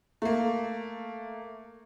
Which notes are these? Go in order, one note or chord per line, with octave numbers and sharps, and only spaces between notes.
A3 A#3